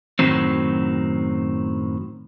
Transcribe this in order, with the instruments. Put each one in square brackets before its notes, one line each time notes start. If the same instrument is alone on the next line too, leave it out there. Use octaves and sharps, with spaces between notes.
[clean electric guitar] F#2 A2 D#3 F#3 C4